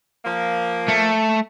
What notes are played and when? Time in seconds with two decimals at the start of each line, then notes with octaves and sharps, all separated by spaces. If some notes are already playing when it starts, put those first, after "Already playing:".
0.24 F3 A#3
0.88 A3